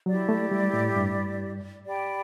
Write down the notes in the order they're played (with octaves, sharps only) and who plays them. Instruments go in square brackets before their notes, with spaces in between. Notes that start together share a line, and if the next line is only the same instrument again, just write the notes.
[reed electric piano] F#3 [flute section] E4 G4 D5
[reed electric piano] A3
G3
A2
G2
[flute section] G4 D5 G5 B5